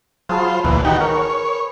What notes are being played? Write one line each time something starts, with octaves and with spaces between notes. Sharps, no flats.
F#3 F4 G#4 C5 A5 B5
D2 A#2 E3 B4
D#3 D#4 F#4 G4
A#4 C#5